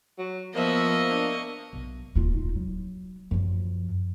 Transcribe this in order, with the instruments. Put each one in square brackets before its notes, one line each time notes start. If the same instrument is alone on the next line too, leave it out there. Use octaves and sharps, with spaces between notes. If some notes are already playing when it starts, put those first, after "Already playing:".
[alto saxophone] F#3
[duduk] F3 [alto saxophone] A#3 [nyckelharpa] B3 E5 [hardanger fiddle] D#5 C#6
[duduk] D4
[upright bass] B1
D#1 F4
D#4
F#3
F#2 F3